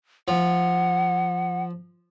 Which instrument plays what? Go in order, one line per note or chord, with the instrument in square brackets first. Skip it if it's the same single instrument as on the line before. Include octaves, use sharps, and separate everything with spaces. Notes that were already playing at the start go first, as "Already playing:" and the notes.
[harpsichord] F3 [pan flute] F#5